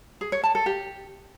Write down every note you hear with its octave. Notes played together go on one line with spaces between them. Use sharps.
G#4
C#5
A5
A4
G4